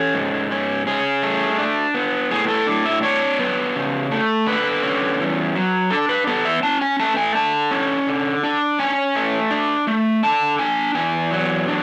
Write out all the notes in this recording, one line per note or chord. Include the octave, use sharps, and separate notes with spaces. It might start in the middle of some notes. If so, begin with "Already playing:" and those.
Already playing: C#4 A4
G#2
C#4
C#4 G#4
A3
D4
B3
A2 G#4
A4
D4
E5
D4 C#5
B3
C#3
A3
D3 B4
C#4
E2
F#3
D4 A4
B4
B3 A4
E5
C#4 A5
G#5
A3 A5
G#5
D3 A5
C#4
D3
D4
C#4 G#5
A3
D4
A3
D3 A5
D4 G#5
E2 G#5
F#3
D4